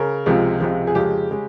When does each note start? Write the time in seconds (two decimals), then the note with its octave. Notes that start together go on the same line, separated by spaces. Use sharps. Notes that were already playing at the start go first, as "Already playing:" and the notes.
Already playing: C#3 A#4
0.26 C#2 C3 F3 G#3
0.61 C#2 C3 F3 G#3
0.87 G#4
0.95 F2 C#3 G#3 G4
1.31 C#3 G#3